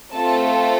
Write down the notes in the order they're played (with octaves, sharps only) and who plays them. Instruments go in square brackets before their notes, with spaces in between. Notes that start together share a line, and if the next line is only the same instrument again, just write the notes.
[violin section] A3 C4 F4 A4 A5